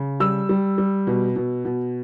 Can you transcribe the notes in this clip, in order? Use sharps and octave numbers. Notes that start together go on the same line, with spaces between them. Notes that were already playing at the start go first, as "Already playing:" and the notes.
Already playing: C#3
G3 E6
G3
G3
B2
B2
B2